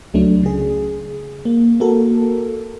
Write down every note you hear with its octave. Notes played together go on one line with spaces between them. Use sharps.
C#2 F#3 A3 D4
C#3 G#4
A#3
A#3 F#4 A4 A#4